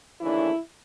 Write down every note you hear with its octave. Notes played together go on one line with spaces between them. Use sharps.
D#2 C#3 E3 A3 D4 E4